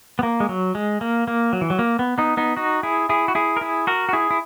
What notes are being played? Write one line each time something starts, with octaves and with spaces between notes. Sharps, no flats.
B3
A#3
G#3
F#3
G#3
A#3
A#3
F#3
E3
F#3
A#3
B3
B3 D#4
B3 D#4
D#4 F#4
E4 G#4
E4 G#4
F#4
E4 G#4
A#4
E4 G#4
F#4 A#4
F#4
E4 G#4
E4